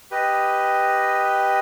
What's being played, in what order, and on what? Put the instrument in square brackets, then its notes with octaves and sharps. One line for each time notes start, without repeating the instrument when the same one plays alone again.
[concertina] G4 B4 D#5